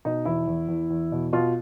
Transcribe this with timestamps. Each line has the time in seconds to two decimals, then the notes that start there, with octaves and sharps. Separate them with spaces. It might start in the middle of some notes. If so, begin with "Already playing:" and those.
0.05 B2 D#4
0.25 E2 E4
0.47 E2
0.68 E2
0.90 E2
1.12 B2
1.33 B2 F4